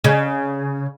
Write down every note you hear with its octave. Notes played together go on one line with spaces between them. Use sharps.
C#3